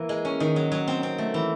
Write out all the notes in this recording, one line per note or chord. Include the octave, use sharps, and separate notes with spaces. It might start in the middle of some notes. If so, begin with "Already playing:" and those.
Already playing: E3 A#3
G#3
C#4
D#3
F#3
F#3
C4
C4
A3
E3